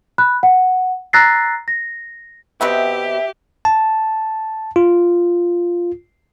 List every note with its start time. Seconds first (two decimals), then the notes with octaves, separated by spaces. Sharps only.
0.18 B5 F#6
0.43 F#5
1.13 A#5 E6 F#6 A6 A#6 C7
1.68 A#6
2.61 B2 B3 C4 G4 E5
3.65 A5
4.76 F4